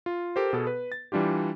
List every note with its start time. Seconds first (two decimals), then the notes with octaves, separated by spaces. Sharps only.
0.06 F4
0.36 G4 A4 A#4 C5
0.53 B2 B3 G#4 A4
0.67 B4
0.92 A6
1.12 E3 G3 D4 F4 G4